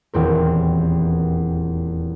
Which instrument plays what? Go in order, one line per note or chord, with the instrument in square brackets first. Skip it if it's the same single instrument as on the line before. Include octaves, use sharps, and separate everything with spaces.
[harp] D#1 E2 C4 A#4